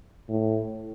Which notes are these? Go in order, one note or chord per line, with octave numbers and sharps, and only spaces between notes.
A2